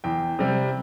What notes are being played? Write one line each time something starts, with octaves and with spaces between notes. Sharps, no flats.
E2 G5
C3 G3